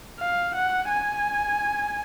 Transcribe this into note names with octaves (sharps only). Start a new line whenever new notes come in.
F5
F#5
G#5